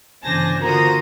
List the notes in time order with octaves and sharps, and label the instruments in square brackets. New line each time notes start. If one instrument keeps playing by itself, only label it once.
[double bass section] G1 C#3 E3 [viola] D4 C5 [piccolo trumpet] G#5 [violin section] A5 A#6
[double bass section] D3 [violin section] A#3 C5 D#6 [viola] F4 F#4 [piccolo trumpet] A#5